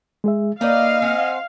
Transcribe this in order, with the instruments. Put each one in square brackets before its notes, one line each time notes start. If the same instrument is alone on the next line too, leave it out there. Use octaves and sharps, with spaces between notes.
[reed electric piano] G#3 G#4 E5
[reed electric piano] A#3 [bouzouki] D#4 B4 D5 [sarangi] D#5 [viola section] F5
[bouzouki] C4 F#5 G#5